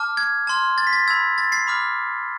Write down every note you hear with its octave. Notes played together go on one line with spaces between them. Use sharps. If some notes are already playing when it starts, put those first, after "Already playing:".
Already playing: A5 D6 F6
G#6
A5 C6 F6
A6
B6
A6
B5 E6 G#6
A6
A6 C7
B5 D6 F6